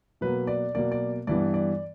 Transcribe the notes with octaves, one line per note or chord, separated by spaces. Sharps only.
B2 F#3 A#3 B4
D5
B2 F#3 A#3 D5
D5
G2 E3 G3 B3 D5
D5